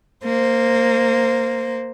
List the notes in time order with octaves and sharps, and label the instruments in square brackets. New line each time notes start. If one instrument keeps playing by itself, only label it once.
[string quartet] A#3 C5